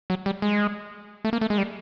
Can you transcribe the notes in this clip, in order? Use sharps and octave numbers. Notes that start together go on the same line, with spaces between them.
F#3
G3
G#3
A3
A#3
A3
G#3
G3